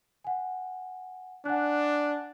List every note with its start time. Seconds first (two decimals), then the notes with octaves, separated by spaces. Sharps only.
0.24 F#5 G#5
1.45 D4 F#5 G#5 F#6